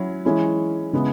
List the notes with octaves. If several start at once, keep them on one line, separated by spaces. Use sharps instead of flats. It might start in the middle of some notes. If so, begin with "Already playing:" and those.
Already playing: F#3 C#4 E4
E3 G#3 C#4 E4
C#3 G#3 B3 E4